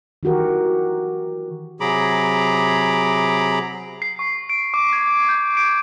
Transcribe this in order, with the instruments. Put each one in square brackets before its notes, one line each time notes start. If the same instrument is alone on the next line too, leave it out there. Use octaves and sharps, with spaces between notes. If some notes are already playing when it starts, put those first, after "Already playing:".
[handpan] D#3 E3 F#4 G4 A#4
[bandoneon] C3 F#3 G#4 A#5 B5 D6
[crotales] C7
C#6
D7
D6
G#6
G6
D7